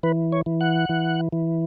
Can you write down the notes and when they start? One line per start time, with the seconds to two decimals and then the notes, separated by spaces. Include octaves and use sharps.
0.03 E3 B4
0.32 C#5
0.46 E3
0.61 F#5
0.89 E3
1.32 E3